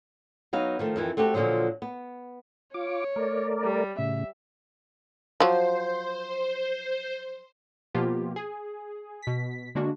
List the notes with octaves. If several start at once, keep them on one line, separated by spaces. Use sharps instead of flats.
F#3 B3 D#4 F5
D#3 F3 A3
F2 D#3 E3
A3 C4 F#4 G4 A4
A#2 D3 D#3 F3 F#3
B3
F4 C#5 D6
A3 A#4 D5
G3
A2 C#3 E5
F3 F#3 C5
B2 F3 A#3 B3 F4 G4
G#4
B2 B6
D3 G#3 A#3 D4 F#4